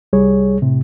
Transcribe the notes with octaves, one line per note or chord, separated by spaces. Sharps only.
C2 G3 G#4 C#5
A2 C3